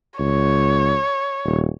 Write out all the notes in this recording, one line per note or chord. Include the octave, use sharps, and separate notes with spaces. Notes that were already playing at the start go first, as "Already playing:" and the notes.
C#2 C#5
D#1